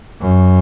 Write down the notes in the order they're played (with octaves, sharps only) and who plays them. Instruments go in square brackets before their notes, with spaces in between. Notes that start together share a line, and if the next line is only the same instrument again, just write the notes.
[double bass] F#2